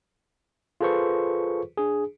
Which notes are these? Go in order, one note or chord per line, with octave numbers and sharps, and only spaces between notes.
F4 G#4 A4 B4 C5 C#6
D4 G#4